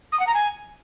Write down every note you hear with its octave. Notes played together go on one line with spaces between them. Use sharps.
D#6
F#5
A#5
G#5